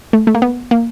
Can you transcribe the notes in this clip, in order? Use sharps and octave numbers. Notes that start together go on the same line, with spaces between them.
A3
A3
A#3
B3
A#3